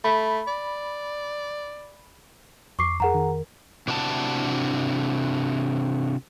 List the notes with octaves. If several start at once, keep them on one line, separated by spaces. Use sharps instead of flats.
A3 B5
D5
F2 C#6 D6 C7
F2 G#4 A#4 F#5 A#5
D#3
C3 D4 E4 F#4 B4 A5